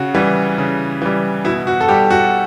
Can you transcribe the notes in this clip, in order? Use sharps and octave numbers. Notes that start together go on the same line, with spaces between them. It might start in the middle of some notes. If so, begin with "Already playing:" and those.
Already playing: C#3 F#4
E3 G3
C#3
E3 G3
B2 E4
F#4
A4
G3 G4
F#4